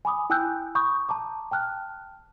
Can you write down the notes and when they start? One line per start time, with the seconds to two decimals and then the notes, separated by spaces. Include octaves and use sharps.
0.05 G#5 B5 D6 D#6
0.30 E4 G5 G#5 E6 F#6 G6
0.75 B5 C#6 D#6 G6
1.09 A5 A#5 D6
1.51 G5 A5 F6 F#6